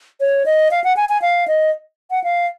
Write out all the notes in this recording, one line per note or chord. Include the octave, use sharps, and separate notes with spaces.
C#5
D#5
F5
F#5
G#5
G#5
F5
D#5
F#5
F5